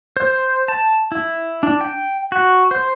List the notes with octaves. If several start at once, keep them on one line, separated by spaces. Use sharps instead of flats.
C5
A5
E4
D4
G5
F#4
C5